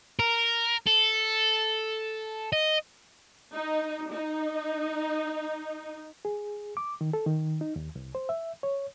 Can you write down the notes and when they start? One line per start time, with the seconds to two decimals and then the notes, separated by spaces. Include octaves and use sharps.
0.19 A#4
0.87 A4
2.53 D#5
3.53 D#4
4.12 D#4
6.25 G#4
6.77 D6
7.01 D#3
7.13 A4
7.26 D#3
7.61 D#4
7.76 D#2
7.96 C2
8.15 C5
8.29 E5
8.63 C#5